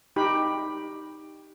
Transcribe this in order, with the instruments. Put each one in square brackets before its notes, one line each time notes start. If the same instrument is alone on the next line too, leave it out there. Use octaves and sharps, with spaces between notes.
[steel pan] D#4 G4 B5